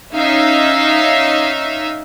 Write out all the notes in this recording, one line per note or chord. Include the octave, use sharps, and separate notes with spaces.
C#4 D#4 E5 F5